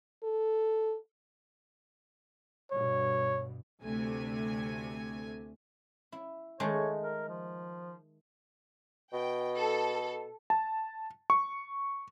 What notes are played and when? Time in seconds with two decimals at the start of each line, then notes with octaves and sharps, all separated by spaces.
0.24 A4
2.71 G2 B2 C#5
3.81 D2 C3 A3 G#5
6.12 E4
6.60 D#3 G#3 A3 C#5
7.03 A#4
7.29 F3
9.13 B2 G5
9.58 A4
10.50 A5
11.30 C#6